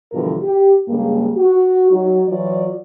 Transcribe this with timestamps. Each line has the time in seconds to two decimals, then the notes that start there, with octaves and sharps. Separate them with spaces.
0.13 G2 B2 D3 E3 F3 A#4
0.42 G4
0.88 G2 C#3 G#3 A#3
1.37 F#4
1.91 F#3 D#4
2.28 E3 F#3 F4 D5